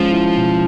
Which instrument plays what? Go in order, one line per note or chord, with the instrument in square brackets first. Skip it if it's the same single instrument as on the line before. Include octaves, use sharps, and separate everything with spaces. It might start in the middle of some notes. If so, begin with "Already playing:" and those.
Already playing: [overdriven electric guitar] F3 [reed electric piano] G#3 C#4
[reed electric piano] E4
B2